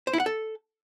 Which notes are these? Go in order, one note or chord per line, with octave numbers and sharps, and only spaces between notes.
C5
E4
F#5
A4